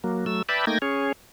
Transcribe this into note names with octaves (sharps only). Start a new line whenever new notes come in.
F#3 A#3
F#3 A3 E6
B4 D5 E5 G5 A5 B5
A3 A#3 D#4 G5 G#6 A#6
C#4 G#4 C#5